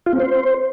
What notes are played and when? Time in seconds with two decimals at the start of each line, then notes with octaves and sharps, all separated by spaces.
0.06 F4
0.13 C4
0.20 C5